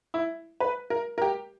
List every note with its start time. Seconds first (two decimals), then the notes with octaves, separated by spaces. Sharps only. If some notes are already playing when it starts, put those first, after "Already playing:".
0.14 E4
0.60 B4
0.90 A#4
1.18 A#4
1.22 G4